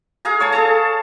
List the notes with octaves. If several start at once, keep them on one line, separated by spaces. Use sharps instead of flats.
G#4 F5 G#5 A#5
C#5 G#5 A5
G#4 A4 C#5 A5